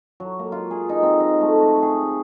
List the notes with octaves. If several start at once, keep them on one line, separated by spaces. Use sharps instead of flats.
F#3
A#3
F4
G#4
D#4
C4
D#5
A3
F#4
G#4